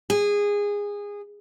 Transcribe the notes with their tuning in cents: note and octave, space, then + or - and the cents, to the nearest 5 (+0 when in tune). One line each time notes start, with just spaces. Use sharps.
G#4 -20